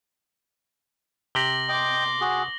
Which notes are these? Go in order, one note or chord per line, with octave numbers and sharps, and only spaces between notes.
C3 G4 A#6 F#7 G7
D#5 G5 C6 D6
F#4 G#4